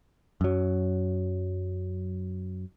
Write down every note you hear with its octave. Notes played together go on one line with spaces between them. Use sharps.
F#2 F#3